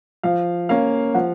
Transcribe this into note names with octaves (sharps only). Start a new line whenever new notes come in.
F3 F5
A#3 C#4 F5
F3 F#5